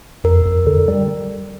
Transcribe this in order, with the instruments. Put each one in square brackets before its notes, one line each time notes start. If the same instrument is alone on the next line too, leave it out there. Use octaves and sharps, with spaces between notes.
[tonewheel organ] F2 [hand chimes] A#4
[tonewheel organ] F2
D3
G3